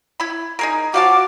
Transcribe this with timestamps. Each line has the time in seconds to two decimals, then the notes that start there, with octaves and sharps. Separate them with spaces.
0.20 E4 B5
0.59 D#4 G#4 A#4
0.94 F3 F#4 F5 A5 D6